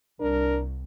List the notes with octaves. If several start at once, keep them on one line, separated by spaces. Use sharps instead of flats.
C2 D4 A#4